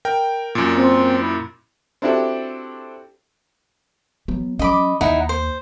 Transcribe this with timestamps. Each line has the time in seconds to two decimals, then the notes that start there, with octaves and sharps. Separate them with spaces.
0.05 A#4 G5
0.55 F#2 A#2
0.75 C4
1.21 E4
2.02 C4 D4 E4 F#4 G4 A4
4.28 F#3 B3
4.59 F#3 C#4 D#5 B5 D6
5.01 D#2 D#4 E4 F#5
5.29 C5